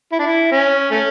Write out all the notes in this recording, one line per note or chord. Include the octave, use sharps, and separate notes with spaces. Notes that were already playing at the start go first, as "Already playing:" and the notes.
E4
D4
E4
C#4
A3 C#4